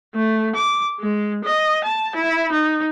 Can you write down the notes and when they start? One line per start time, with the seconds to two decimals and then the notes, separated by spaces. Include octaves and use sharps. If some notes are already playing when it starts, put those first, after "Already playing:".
0.15 A3
0.55 D6
1.00 G#3
1.44 D#5
1.84 A5
2.15 E4
2.52 D#4